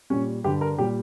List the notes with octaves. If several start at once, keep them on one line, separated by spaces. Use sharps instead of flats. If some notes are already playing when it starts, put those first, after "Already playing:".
A#2 G3 C#4
G2 D3 G3 G4
A#4
A#2 G3 G4